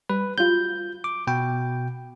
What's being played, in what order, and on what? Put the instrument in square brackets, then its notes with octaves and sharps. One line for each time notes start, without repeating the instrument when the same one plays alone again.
[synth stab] G3 [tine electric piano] B4
[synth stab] F#3 G3 F4 [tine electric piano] G6
[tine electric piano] D6
B2 G5